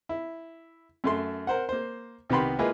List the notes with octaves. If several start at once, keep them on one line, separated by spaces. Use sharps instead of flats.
E4
F#2 A3 C6
A#4 C5 F#5
A#3 C5
C2 D#3 B3 G4 B5 C6
G#3 A#3 E4 F4 G#4 B4